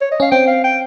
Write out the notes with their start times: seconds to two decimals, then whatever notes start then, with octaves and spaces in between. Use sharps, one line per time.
0.02 C#5
0.12 D#5
0.20 C#4 F5
0.32 C4 G5
0.48 F5
0.64 G5